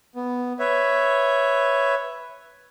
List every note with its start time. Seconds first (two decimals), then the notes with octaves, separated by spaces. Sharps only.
0.16 B3
0.59 B4 C#5 E5